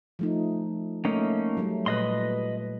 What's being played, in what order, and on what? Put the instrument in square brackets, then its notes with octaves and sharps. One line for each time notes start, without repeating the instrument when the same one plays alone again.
[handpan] F3 A3 D#4
[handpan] A3 [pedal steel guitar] A#3 C#4 D#4
[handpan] F#3 G3 A3
[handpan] A#2 [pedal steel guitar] B4 D#5 C6